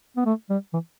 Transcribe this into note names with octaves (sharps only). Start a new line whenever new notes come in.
B3
A3
G3
E3